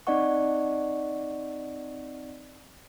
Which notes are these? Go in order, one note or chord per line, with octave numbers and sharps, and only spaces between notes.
C4 D#4 D5 D#5 F#5 C#6